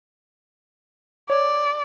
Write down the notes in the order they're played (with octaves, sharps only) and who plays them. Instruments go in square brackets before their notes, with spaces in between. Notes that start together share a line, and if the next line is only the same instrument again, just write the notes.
[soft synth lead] C#5 [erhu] D5